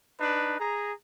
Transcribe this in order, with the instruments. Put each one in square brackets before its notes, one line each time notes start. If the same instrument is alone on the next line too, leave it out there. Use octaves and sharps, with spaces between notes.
[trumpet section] D4 D#4 B4
G#4 A#5